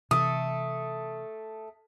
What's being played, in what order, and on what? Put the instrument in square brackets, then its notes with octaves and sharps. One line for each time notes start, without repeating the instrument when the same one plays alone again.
[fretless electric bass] C3 E3 [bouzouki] A3 [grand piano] D#6